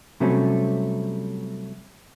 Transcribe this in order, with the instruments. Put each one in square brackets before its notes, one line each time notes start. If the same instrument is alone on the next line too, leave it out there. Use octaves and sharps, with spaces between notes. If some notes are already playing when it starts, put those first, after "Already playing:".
[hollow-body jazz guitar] C3 F#3 G3 A3 C4 C#4